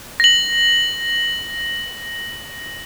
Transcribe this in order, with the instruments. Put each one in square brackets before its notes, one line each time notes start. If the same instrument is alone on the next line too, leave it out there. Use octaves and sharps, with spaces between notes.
[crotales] A#6 F#7